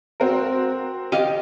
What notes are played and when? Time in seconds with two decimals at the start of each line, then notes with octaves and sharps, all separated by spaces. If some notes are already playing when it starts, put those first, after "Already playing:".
0.20 C4 F#4 A#4
1.12 G4 D#5 F5